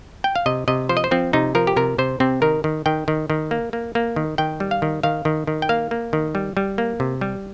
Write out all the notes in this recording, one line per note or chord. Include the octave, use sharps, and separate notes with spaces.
G5
F5
C3 D#5
C3 D#5
F3 C5
D#5
C5
F3 C4
C3 D#4
F3 A#4
G4
C3 A#4
C3 C5
C3 C4
D#3 A#4
D#3
D#3 G5
D#3
D#3
A#3
A#3
A#3
D#3
D#3 G5
G3
F5
D#3
D#3 F5
D#3
D#3
G5
A#3 F5
A#3
D#3
G3
G3
A#3
C3
G3